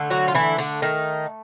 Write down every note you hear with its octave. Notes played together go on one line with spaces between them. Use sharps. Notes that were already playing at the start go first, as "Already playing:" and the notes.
Already playing: D3 A3
F#3 F#4
F4
E3 E4
D3 D4
D#3 D#4